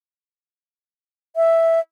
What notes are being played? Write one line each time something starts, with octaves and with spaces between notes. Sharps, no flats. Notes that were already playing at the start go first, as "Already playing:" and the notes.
E5